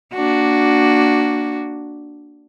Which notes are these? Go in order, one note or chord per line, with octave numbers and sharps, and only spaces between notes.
A#3 D4 F#4